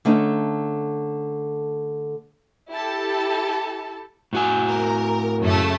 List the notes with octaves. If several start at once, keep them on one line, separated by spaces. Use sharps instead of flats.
D3 A3 C#4 D#4
E4 G4 A4 A5
A2 F#4 G#5
A#4
F#2 C#3 A3